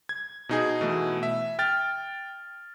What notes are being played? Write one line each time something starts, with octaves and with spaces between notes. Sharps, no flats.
G#6
B2 D#4 G#4
B2 E3 A3
E5
G5 F6 A6